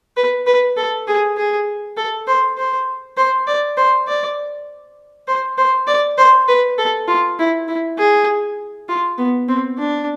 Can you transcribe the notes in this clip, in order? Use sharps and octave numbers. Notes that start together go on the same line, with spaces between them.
B4
B4
A4
G#4
G#4
A4
C5
C5
C5
D5
C5
D5
C5
C5
D5
C5
B4
A4
F4
E4
E4
G#4
F4
B3
C4
D4